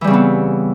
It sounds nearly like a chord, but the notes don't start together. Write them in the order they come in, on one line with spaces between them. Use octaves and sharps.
E3 G3 C#3 C4 B3